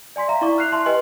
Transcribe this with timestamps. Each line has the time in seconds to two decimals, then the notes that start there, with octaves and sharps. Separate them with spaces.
0.16 D5 G#5 C6 B6
0.28 E5 F5 A#5
0.41 E4 D5 C#6 D6
0.58 F6 F#6 C7 F7
0.72 E5 A5 C6
0.86 G4 B4 D#5 G5 G#5 F#7